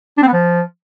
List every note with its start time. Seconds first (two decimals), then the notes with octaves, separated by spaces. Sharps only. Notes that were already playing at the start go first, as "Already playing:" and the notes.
0.17 D4
0.22 C4
0.28 B3
0.33 F3